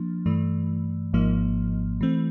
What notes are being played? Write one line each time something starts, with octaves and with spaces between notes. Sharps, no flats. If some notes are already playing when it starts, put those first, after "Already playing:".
Already playing: F3 A#3 D4
G2 E3 A3
G#1 G#2 F3 A#3
E3 A3 C4